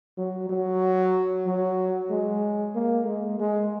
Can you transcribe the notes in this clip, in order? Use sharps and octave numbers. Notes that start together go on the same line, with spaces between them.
F#3
F#3
F#3
G#3
A#3
G#3
G#3